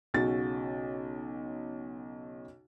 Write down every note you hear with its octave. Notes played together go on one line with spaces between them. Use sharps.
B1 C#3 F#4 A6